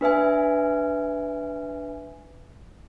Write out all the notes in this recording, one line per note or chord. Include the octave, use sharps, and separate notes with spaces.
D4 B4 E5 G#5